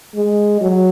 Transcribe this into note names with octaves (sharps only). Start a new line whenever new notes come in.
G#3
F#3